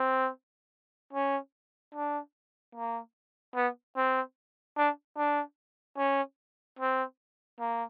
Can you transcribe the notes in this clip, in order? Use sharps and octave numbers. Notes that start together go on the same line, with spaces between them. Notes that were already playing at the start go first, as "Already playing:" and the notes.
Already playing: C4
C#4
D4
A#3
B3
C4
D4
D4
C#4
C4
A#3